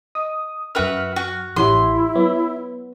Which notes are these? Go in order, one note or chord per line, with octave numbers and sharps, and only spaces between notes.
D#5 D#6
F#2 F#4 A#4 B4 E5 F6
F#4
A1 E4 G4 C#5 F#5 C6
F#3 B3